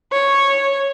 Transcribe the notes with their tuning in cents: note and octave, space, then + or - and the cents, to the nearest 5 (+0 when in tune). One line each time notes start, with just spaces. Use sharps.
C#5 -5